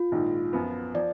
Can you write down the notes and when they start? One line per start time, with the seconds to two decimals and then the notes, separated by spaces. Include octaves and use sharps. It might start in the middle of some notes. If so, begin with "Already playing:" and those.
Already playing: F4
0.12 A#1 G#2 D#3
0.53 F#2 F3 B3
0.94 F3 D5